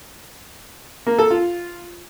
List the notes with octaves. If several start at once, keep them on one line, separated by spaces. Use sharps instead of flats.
A#3
A4
F4